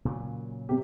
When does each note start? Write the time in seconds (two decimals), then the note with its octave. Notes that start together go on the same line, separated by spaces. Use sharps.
0.05 A#2 C#3 F#3
0.69 C3 G4